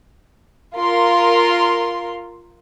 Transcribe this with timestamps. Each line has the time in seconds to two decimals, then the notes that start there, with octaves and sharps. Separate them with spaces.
0.76 F4 A#4 C6